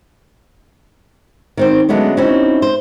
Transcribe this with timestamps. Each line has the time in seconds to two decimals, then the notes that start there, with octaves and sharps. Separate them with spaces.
1.57 D#3 C4 C5
1.89 D3 F#3 G#3 A3 B3 C#4
2.17 C4 C#4 D#4 E4 F#4
2.62 C5